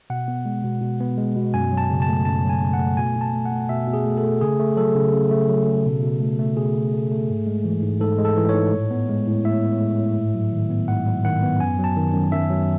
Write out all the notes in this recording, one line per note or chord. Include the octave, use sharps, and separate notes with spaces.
B2 F#5
B3
G#3
B2
B2
B3
G#3
B2
F#2 G#5
F#3
A5
C#3
A5
A3
F#2 A5
F#3
G#5
C#3
F#5
A3
B2 G#5
B2
A5
A3
F#5
A3
B2 E5
B2
G#4
A3
A4
A3
C#3 G#4
A3
F#3 A4
C#3
C#3
A3
F#3
C#3
B2
B2
A3
A3
B2 G#4
B2
A3
A3
G#2
G#3
E3
G#2
G#2 A4
G#3
A4
E3
C#5
G#2
A2
B3
G#3
A2
A2 E5
B3
G#3
A2
G#2
F#3
D#3
B3
G#2 F#5
F#3
D#3 F#5
B3
F#2 G#5
F#3
A5
D#3
F#2
F#2 E5
F#3